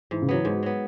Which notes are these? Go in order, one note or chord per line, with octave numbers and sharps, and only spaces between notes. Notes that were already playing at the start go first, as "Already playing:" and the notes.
G#2 E3
C#3
E3 F#3 B3
G#2 G#3
F#3 B3